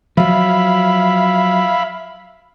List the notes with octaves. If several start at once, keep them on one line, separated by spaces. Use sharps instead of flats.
F3 F#3 E5 F5 B5